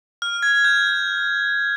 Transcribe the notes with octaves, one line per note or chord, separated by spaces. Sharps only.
F6
G#6
G6